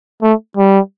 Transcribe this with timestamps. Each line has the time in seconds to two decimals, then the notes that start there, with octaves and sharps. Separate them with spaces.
0.22 A3
0.58 G3